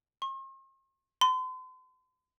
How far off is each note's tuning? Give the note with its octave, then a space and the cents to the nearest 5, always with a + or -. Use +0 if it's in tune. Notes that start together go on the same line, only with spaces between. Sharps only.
C6 +45
C6 -40